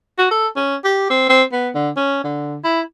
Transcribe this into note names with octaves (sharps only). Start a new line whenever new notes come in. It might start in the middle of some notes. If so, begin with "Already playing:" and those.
F#4
A4
C#4
G4
C4
C4
B3
D3
C#4
D3
E4